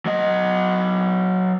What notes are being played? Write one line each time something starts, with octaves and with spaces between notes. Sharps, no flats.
F#3 D#5